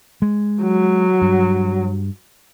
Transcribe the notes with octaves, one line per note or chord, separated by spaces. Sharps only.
G#3
F#3
G2